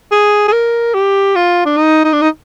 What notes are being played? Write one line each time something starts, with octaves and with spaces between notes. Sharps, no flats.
G#4
G#4
A#4
G4
F4
D4
D#4
D#4
D4
D#4